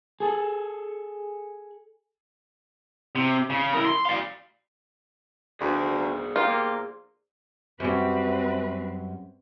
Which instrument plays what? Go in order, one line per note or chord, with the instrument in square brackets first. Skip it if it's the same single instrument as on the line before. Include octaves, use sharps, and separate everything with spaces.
[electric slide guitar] G#4 A4
[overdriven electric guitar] C3
C#3
E4 A#4
C6
D5 F5
[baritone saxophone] D2 [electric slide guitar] G#4 C5 D5
[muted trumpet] A#3 [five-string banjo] F4 [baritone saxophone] G4
[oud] F#2 G3 [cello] C4 B4